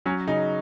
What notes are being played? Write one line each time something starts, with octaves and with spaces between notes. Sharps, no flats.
F#3 C#4
C#3 D#4